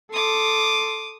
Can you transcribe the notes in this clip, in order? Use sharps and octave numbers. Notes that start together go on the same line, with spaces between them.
A4 C6 D6 D#6